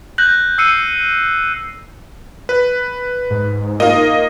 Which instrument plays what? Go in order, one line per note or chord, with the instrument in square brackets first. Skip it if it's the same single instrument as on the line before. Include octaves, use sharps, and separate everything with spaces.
[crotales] F#6 G6 A#6 F#7
E6 C7 C#7 D#7
[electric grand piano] B4
[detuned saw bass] G#2
[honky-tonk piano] A#3 D#4 F4 [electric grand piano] D#5